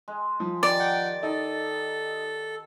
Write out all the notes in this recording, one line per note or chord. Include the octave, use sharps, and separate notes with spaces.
G#3
F3
D#3 G4 D5
F#5 G5
D#4 A4